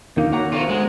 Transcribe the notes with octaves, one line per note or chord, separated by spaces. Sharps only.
D#2 A#3 D#4
F#3 A#3 C#5 F#5 A#5
D2 B3 F4 F#4
G#3